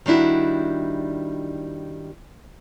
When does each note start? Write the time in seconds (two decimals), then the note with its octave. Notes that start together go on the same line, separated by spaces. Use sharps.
0.06 D#3 G3 D4 E4 F#4